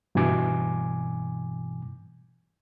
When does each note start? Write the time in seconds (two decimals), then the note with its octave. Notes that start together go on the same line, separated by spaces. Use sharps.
0.15 G2 B2 E3 G#5 D6